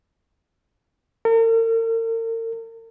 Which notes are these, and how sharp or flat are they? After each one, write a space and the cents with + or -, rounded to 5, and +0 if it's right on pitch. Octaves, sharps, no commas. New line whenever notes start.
A#4 -45